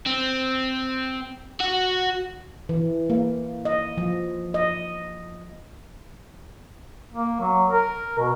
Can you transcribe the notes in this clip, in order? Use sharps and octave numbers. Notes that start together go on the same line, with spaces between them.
C4
F#4
E3
A#3
D#5
F3
D#5
A#3
F#3
A#4
B2